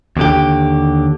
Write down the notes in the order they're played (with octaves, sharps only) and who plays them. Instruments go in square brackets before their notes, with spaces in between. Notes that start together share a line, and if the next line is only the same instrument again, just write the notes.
[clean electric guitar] D#2 D3 G4